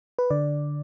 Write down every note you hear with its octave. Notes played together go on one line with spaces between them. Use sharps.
B4
D3 D5